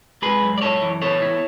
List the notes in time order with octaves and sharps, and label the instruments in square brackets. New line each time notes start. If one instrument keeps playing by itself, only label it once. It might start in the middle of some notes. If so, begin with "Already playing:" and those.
[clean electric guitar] G#3 G#4 B4
F#2
D5
F#2 A4 C#5
E3
B3 A4 C#5
E4